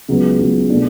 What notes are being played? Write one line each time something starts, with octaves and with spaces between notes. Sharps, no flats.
C#2 C#3 F#3 B3
C#2 C#3 F#3 B3
B2 A3 D4